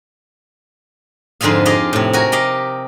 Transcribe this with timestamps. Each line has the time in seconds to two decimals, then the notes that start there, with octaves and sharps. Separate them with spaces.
1.41 F2 G#2 D3 F4 G#4 F5
1.65 F4 G4 G#4 D#5 F5
1.93 A2 C3
2.13 F#4 A#4 G#5
2.32 G4 D#5 F5